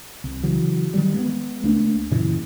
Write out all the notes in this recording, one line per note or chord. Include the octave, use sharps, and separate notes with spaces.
C2
C#3 E3 F#3
D#3 F#3 G3
G#3 A#3 B3
C#2 A3 A#3 D4
F#2 A#2 C#3 E3